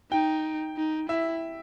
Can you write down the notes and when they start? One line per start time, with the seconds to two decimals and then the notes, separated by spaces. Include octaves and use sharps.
0.11 D#4 G5
0.77 D#4
1.09 E4 E5